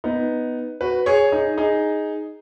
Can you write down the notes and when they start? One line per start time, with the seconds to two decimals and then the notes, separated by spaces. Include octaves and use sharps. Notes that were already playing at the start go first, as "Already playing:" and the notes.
0.04 B3 D#4
0.81 F#4 B4
1.06 G#4 C#5
1.32 D#4 G#4
1.58 D#4 G#4